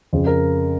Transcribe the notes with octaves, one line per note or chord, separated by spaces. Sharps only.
F2 C#3
A#4